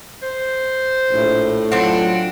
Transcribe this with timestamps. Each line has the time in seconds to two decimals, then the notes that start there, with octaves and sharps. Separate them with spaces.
0.23 C5
1.10 A#1 A2
1.72 F#3 C4 D4 F4 F#5